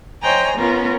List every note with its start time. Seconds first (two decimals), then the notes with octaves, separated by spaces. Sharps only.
0.21 C5 C#5 D#5 G5 G#5 A#5
0.57 B3 C#4 F4 A#4